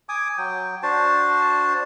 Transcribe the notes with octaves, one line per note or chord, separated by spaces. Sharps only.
G#5 D6 D#6
F#3 G5
D4 F#4 C5 A5